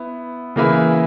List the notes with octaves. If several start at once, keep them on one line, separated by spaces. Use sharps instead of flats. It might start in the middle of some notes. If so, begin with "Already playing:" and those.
Already playing: B3 E4
C#3 E3 A#3 E4 B4